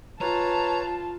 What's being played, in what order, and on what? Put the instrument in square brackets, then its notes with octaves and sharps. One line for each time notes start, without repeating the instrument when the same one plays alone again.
[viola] F4 [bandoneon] B4 C#5 [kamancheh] A5 [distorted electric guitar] A#5